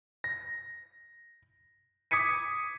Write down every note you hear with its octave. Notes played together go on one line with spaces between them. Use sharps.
A#6
D6 D#6 G#6 B6 C#7 D#7